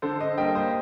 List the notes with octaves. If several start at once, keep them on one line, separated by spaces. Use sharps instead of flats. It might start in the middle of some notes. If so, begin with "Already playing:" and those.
D3 A4 C5
C5 D#5
G3 A#3 D#5 G5
C5 D#5